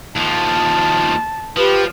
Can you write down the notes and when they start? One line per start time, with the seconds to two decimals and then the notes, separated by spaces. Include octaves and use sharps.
0.16 D#2 F3 A5
1.57 F3 G4 B4